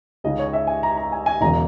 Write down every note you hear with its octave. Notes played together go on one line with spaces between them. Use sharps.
C#2 C#3 G#3 D#4 D#5
C#5
E5
G#5
A#5
A#5
G#5
G#5
E1 E2 C#3 A#5